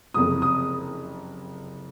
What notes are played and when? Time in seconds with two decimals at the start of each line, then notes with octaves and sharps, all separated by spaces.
0.14 F#1 F2 C3 D#6
0.42 D#6